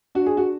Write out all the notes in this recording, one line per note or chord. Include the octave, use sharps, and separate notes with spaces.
D4 F#4
G#4
F#4